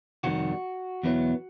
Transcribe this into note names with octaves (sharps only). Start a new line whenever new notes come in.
F2 C3 D#3 G3 F#4
E2 B2 F#3 B3 E4